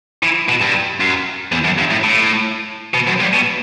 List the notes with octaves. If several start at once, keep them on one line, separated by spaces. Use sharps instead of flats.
E3
B2
G2
F#2
E2
F#2
G2
A2
A2
B2
F#2
G2
B2